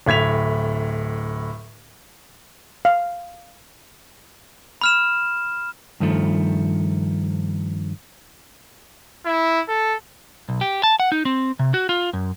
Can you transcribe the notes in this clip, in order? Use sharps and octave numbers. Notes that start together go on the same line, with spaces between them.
D1 A2 G#6 B6 F7
F5
B5 F6 E7
G2 D#3 F3 A3
E4
A4
B1
G4
A5
F#5
D#4
C4
C3
F#4
F4
F#2